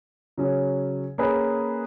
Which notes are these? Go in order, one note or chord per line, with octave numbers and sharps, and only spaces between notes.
C#3 F#3 C#4
A#3 C#4 G#4 B4